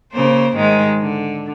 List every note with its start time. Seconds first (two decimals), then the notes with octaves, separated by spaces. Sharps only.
0.13 C#3 A#3 C5
0.56 G#2 D#3 G#3
1.01 D3